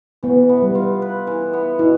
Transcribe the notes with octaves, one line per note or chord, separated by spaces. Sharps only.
E3 B3
B3
G3
F4
B4
E3
B3
B2 E4